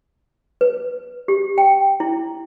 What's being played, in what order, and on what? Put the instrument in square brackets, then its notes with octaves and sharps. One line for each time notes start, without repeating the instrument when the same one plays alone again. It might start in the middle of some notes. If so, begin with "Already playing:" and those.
[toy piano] B4
G4
G5
E4